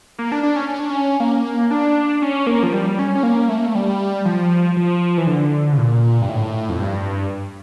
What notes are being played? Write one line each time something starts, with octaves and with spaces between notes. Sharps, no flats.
A#3
D4
D4
C#4
C#4
D4
C#4
A#3
D4
C#4
A#3
F3
G3
C#4
C#4
A#3
A3
A#3
A3
G3
F3
F3
E3
D3
C#3
A#2
G2
A2
F2
G2